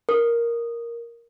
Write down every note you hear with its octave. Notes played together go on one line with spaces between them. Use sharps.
A#4